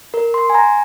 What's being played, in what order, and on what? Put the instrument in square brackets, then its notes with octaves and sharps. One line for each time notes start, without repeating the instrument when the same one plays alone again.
[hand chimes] A#4
C6
G#5
A#5